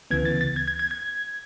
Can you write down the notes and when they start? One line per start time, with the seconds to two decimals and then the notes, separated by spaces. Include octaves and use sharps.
0.11 D2 C#3 E3 B3 G#6
0.25 A6
0.41 A6
0.56 G#6
0.68 G#6
0.79 G#6
0.91 G#6